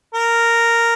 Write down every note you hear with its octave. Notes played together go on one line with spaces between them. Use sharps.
A#4